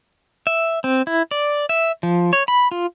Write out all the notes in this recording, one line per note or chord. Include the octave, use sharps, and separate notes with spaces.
E5
C4
E4
D5
E5
F3
C#5
B5
F4